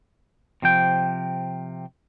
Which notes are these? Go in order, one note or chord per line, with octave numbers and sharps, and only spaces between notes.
C3 F3 G5